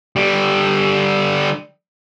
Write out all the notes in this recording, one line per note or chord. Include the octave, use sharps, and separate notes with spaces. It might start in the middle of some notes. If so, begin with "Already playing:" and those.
D3 G3